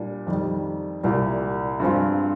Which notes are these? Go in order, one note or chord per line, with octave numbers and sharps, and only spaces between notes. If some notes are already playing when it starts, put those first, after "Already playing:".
Already playing: A#2 G3 D4
F2 D#3 G3
C2 A#2 G3
G2 F3 G#3 C4 F4